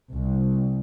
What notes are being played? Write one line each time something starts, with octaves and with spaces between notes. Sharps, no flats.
C2